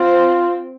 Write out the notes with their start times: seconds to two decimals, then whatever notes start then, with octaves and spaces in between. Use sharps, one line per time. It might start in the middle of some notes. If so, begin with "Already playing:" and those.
Already playing: C4 F4